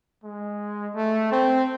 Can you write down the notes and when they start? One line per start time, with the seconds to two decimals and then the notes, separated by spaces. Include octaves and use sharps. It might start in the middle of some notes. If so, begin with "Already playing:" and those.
0.24 G#3
0.95 A3
1.32 C4